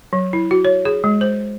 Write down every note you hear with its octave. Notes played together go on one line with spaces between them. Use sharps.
F#3
E4
F#4
C#5
G#4
G#3
C5